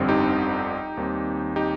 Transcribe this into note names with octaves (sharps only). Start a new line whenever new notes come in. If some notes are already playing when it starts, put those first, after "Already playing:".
Already playing: G1 F2 D3 G3 C4
D#4 G4
D#2 D#3 G3 C4
D#4 G4